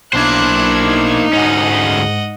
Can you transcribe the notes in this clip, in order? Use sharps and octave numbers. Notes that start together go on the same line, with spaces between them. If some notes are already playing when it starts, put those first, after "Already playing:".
B1 A#3 D4 E4 C5 F#6 G#6
D#4
D2 G#2 C#4 D#5 F#5